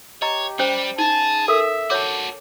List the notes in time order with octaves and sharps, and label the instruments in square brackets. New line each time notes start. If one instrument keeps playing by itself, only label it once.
[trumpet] G4 [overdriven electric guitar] C#5 [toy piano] D#5 A#5
[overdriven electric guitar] G3 [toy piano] C#4 C5
[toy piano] D#4 [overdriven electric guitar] G#4 [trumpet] A5
[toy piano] A4 A#4 [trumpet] E5
[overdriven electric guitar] F#4 A4 [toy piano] C#5 D6